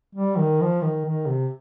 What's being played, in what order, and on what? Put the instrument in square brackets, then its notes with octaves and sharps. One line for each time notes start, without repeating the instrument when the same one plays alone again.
[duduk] G3
D#3
F3
D#3
D#3
C3